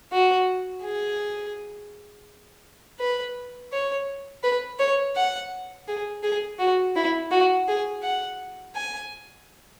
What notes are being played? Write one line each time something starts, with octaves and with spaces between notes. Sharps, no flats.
F#4
G#4
B4
C#5
B4
C#5
F#5
G#4
G#4
F#4
E4
F#4
G#4
F#5
G#5